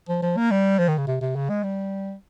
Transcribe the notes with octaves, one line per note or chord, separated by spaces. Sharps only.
F3
F3
A#3
G3
F3
D#3
C#3
C3
C3
C#3
G#3
G3